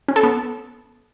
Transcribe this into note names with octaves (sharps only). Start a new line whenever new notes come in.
C#4
A4
B3